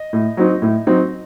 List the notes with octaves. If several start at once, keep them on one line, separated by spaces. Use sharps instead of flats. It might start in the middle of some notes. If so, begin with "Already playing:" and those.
Already playing: D#5
A2
F#3 C4 D#4
A2
F#3 C4 D#4